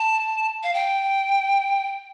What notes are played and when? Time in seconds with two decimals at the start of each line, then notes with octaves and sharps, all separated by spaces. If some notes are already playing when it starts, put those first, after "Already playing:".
Already playing: A5
0.63 F5
0.74 G5